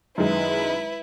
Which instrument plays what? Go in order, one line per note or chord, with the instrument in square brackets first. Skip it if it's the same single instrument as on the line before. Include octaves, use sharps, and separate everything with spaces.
[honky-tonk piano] F#2 D#3 G#3 [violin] E4 B4